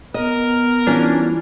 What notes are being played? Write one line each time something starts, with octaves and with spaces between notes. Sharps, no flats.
B3 A#4 D#5
E3 G3 C#4 D4 F4